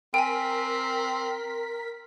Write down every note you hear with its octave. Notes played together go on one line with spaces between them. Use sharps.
C4 A#4 G5 G#5 B6